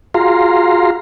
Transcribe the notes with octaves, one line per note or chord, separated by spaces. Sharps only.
F4 F#4 G#4 F5 A#5 C6